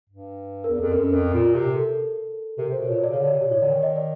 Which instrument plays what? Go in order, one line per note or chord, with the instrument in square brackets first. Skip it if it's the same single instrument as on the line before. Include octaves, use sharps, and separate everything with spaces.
[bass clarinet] G2
[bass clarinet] E2 [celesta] A#4
[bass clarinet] F2 [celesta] A4
[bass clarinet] F#2 [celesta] A#4
[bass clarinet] F2
A#2
C3
[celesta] A4
[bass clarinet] C3 [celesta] A#4
[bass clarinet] C3 [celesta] C5
[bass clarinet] B2
[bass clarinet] A#2 [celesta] C#5
[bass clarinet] B2 [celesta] D5
[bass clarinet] C#3 [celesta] C#5
[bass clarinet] D3
[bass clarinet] C3 [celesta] D5
[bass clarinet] B2 [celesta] D5
[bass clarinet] A2 [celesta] C#5
[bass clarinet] D3 [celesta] D5
[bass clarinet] D#3
[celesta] D#5
D5